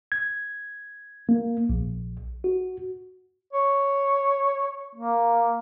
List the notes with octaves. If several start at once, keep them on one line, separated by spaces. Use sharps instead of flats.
G#6
A#3
A#1
F#4
C#5
A#3